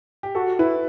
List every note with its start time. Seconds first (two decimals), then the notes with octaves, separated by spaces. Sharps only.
0.23 G4
0.35 F#4 A4
0.59 E4 B4